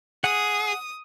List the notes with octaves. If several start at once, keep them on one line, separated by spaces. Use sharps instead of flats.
G#4 F#5 D#6